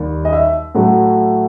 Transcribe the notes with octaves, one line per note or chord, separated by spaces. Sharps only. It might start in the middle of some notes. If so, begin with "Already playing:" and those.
Already playing: D#2 D#3 G3
D#5
E5
A2 F#3 A3